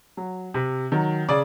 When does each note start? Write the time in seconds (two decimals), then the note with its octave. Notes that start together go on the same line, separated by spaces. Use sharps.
0.17 F#3
0.54 C3
0.92 D#3 F#3
1.29 C#3 D5